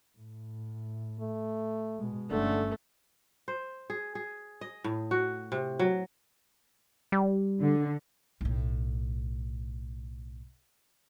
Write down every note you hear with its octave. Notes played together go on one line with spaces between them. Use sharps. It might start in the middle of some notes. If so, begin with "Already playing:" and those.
A2
A3
B2 G#3
G1 D3 A3 C#4
C5
G#4
G#4
D#5
A2
F#4
C3
F#3
G3
D3
B1 A2